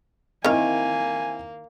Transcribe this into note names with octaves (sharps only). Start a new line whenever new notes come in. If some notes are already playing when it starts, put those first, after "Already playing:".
D#3 A#3 C4 E4 F5 G#5